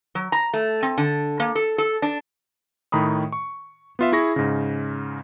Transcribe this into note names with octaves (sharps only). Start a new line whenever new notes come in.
F#3
A#5
A3
C4
D3
A#3
A4
A4
D4
A2 D#3 A#5 B5 D#6
C#6
B3 F4 E5
E4 G#4 C#6 A#6
G#2 C#3